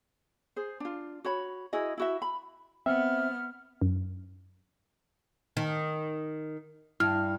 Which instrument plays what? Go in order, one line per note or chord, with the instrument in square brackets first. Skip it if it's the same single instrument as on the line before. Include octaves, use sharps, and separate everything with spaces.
[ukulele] G#4 C5
D4 F4
F#4 C#5 B5
E4 F#4 G#4 D#5
E4 F#4 E5
B5
[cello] B3 [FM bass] C4 [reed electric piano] E5 [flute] F6
[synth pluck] F#2
[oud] D#3
[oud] G2 [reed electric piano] E4 F6